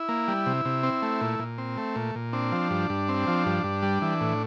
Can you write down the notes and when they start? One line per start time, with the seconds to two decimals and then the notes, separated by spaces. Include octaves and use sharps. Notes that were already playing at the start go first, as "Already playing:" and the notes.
Already playing: E4
0.09 A#3
0.28 G3
0.46 C3
0.65 C3
0.83 C4
1.02 A3
1.21 A#2
1.39 A#2
1.58 C4
1.77 A3
1.96 A#2
2.15 A#2
2.33 C4 D4
2.52 F3
2.71 G2
2.90 G2
3.09 C4
3.27 F3
3.46 G2
3.64 G2
3.82 G3
4.02 E3
4.21 A2